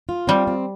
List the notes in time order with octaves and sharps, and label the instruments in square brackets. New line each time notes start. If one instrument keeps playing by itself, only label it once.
[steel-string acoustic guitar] F4
[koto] G3 [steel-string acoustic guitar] C4
[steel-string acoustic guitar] C4